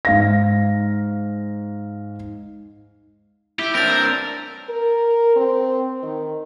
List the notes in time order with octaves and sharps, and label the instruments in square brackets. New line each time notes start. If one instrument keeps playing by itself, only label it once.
[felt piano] G#2 F5 A#6
[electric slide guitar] E4 [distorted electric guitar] G4
[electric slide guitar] C4 D4 [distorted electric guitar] A#4 [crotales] G6 A6
[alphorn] A#4
C4
D#3